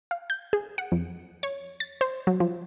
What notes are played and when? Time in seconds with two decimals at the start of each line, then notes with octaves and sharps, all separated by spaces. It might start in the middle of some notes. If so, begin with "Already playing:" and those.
0.11 F5
0.30 G6
0.53 G#4
0.78 F#5
0.92 F2
1.43 C#5
1.80 A6
2.01 C5
2.27 F#3
2.40 F3